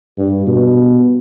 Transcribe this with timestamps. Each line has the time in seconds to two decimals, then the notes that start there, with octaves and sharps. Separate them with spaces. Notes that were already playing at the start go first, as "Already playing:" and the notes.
0.18 G2
0.47 B2